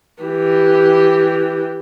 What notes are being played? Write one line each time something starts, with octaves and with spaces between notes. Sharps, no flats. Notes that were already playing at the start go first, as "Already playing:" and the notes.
E3 G4